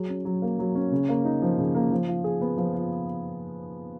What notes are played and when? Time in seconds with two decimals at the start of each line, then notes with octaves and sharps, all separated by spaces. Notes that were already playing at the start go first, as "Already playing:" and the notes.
Already playing: F#3 G#4
0.09 C#4
0.25 F#3
0.42 A#3
0.59 F#3
0.75 C#4
0.92 C#3
1.09 A#3
1.25 D#4
1.42 F3
1.58 C#3
1.75 A#3
1.91 F3
2.09 F4
2.24 G#4
2.41 B3
2.58 F3
2.74 F4